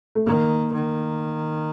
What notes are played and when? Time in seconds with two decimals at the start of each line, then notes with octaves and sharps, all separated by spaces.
0.15 A3
0.26 D#3 A#3
0.73 D#3